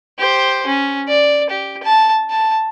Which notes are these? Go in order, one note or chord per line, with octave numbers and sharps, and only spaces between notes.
G4 C5
C#4
D5
G4
A5
A5